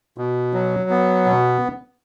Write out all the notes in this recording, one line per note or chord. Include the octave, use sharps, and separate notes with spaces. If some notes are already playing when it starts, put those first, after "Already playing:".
B2
F#3
B3
B2